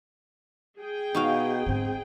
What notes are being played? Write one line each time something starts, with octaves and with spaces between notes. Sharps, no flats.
G#4 G5
B2 D#4 F#4 F5
G#2 D3 C4